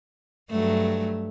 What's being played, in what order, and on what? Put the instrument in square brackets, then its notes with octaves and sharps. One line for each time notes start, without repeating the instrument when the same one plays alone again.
[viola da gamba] G2 F#3 A3